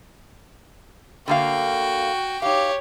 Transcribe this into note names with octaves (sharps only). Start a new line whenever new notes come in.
D3 A#3 F#4 F5 G5
D#4 G4 C#5 F5